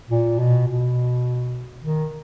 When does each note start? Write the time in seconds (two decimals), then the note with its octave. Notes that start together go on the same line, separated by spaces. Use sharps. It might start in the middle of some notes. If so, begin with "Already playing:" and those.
0.10 A#2
0.39 B2
0.68 B2
1.84 D#3